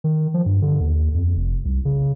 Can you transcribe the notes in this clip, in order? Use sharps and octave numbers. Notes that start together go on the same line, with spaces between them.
D#3
F3
G2
D3
D#2
F2
F1
C2
C#3